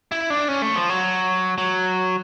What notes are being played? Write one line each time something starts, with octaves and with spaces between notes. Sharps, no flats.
E4
D4
C#4
A3
F3
F#3
F#3